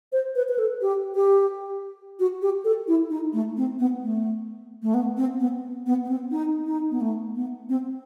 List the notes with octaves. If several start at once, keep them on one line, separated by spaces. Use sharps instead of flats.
C5
B4
B4
A4
G4
G4
F#4
G4
A4
E4
D#4
A3
C4
B3
A3
A3
B3
C4
B3
B3
B3
C4
D#4
D#4
B3
A3
B3
C4